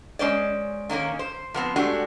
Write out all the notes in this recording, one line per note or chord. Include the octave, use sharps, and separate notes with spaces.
G#3 C#4 C5 D5
D#3 A#3 C#4 A#4
C5
F3 B3 C4
G#3 A3 D4 F#4 G4